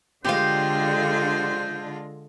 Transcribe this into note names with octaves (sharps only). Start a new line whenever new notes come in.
D3 G#3 F4 G4 C5 F5